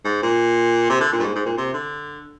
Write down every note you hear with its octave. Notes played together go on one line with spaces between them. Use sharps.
G#2
A#2
C3
D3
A#2
G2
G#2
G#2
A#2
C3
D3